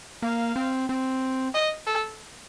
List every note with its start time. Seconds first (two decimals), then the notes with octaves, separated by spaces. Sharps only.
0.22 A#3 F5
0.56 C4
0.89 C4
1.54 D#5
1.87 A4